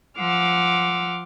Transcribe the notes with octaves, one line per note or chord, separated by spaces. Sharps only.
F3 F#5 C6 D6 E6 F6